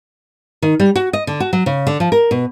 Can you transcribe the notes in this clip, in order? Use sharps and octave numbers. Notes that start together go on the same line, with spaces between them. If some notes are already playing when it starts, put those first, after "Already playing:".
D#3
G3
F#4
D#5
D3
F#4
F#3
C#3
D3
F3
A#4
B2